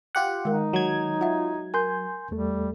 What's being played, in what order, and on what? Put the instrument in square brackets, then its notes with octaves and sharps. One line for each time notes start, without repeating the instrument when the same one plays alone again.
[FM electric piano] F4 G4 F#5
[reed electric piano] D#3 [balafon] G#3 A#4 [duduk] D#4
[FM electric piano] F#3 G#6
[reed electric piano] F4 [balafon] E5 F#5
[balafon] A#4 [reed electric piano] G#5 C6 G6
[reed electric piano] E2 A3 A4 [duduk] G3